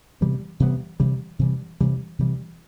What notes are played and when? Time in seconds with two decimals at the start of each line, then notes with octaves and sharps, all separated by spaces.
0.21 C3 E3 G3 B3
0.60 C3 E3 G3 B3
1.00 C3 E3 G3
1.39 C3 E3 G3
1.80 C3 E3 G3
2.19 C3 E3 G3